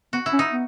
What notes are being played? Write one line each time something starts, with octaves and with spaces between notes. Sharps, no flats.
B3 F#4
E4
C#4
D#4
B3